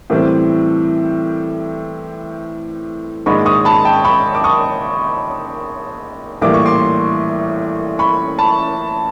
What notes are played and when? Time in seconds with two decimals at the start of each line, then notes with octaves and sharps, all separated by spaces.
0.10 A2 E3 G3 C4
3.26 A#1 G#2 D#3 G#3 B5 C#6
3.46 C#6 D#6
3.65 A5 B5
3.85 G5 A5
4.04 B5 C#6
4.35 D6
4.44 C#6 D#6
6.42 A#1 A2 E3 G3 A#3 D6
6.54 C#6
6.66 C6 D6
7.99 B5 C#6
8.39 A5 B5